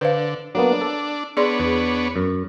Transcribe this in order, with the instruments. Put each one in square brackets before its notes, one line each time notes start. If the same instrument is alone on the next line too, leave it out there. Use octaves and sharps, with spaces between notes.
[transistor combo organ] D3 [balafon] B4 C5 F5
[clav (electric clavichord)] F#3 A#3 B3 [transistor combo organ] D4
[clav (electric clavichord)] A4
[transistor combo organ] B3 D4 C#5 [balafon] G#4 D5 C6
[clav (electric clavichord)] E2
F#2